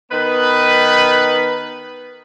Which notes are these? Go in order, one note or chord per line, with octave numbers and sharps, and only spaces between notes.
D#3 B3 D#4 B4